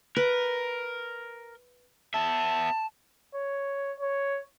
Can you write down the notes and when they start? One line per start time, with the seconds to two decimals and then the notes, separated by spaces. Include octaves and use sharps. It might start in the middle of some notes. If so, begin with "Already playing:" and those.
0.16 A#4 B4
2.14 B3 E5 A5
3.35 C#5
4.00 C#5